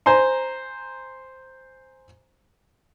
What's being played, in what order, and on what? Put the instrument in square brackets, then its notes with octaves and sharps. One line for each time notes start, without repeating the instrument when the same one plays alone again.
[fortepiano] C5 G#5 A#5 C6